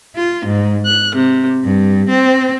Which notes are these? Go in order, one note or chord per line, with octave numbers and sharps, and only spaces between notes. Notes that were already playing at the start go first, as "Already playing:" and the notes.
F4
G#2
F#6
C3
G2
C4